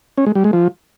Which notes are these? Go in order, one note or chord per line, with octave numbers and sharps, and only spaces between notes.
C#4
G#3
G3
G#3
F3